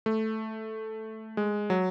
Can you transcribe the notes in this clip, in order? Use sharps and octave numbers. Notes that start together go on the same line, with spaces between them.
A3
G#3
F#3